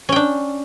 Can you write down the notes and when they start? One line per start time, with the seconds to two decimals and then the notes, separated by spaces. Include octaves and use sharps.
0.09 C#4
0.12 G5
0.16 D4